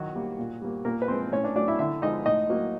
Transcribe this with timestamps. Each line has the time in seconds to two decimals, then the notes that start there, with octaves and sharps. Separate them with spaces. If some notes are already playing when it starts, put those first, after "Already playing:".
Already playing: D#3 F#3 F#4
0.15 G3 A#3
0.39 A#2
0.62 G3 A#3
0.85 A#2 A#3 A#4
1.02 B4
1.08 F3 G#3 C4 C5
1.32 A2 C#4 C#5
1.44 D4 D5
1.56 F#3 A3 D4 D5
1.68 E4 E5
1.79 D3 E4 E5
2.02 F3 G#3 D#4 D#5
2.26 A2 D#4 D#5
2.50 F#3 A#3